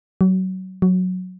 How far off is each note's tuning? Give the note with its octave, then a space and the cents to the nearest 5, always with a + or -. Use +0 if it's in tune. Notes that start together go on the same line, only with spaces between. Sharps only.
F#3 +20
F#3 -10